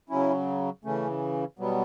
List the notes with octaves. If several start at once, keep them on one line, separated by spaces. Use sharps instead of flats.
C#3 F#3 C#4 E4
C#3 E3 A3 C#4
B2 F#3 G3 B3